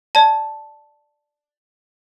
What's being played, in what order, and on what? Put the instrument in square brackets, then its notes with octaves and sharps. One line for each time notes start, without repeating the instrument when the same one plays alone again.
[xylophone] D5 A5